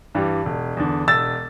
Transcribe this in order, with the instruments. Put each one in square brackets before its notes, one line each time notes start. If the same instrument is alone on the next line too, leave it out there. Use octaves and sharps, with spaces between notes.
[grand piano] G2 E3 G3
E1
E2 D3
E1 E6 A6